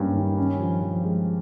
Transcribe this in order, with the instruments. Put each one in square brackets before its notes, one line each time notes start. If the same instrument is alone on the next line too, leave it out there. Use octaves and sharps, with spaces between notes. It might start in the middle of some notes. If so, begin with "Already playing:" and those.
Already playing: [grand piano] G2 A#3 C#4
D#3
C#4
F3
F3
G#3